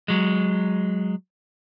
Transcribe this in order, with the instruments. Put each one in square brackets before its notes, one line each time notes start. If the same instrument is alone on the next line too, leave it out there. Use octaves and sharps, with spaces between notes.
[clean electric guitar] F#3 G#3